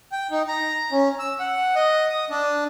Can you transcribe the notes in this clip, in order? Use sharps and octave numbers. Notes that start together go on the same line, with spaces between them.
G5
D#4
A#5
C#4
E6
F#5
D#5
D#6
D4